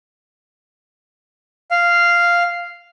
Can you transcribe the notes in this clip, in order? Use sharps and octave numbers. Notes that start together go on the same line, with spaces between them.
F5